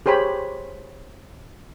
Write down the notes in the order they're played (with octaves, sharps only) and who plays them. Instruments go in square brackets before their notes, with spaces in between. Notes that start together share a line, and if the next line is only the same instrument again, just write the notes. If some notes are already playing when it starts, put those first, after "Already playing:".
[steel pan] G4 G#4 C5 C#5 B5